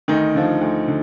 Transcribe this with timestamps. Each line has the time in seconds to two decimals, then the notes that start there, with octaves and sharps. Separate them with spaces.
0.08 D2 D#3 D#4
0.35 D3 F3
0.61 D2
0.88 D3